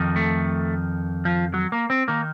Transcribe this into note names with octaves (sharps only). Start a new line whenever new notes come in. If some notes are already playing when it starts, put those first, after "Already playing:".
Already playing: F2 D#3
A3
F3
F#3
A#3
C4
D#3 A#3